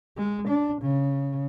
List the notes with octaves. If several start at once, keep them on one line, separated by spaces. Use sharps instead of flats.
G#3
D4
C#3